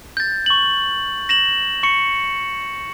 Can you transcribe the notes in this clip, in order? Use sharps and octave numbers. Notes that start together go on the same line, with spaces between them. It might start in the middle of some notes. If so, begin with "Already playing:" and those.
G6 A6
C#6 F#7
A#6 E7 F#7
C#6 C#7